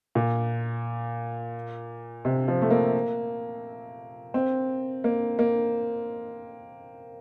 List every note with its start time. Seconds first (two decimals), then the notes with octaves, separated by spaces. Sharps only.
0.15 A#2
2.25 C3
2.48 F3
2.62 A3
2.71 A#3
4.34 C4
5.04 A#3
5.39 A#3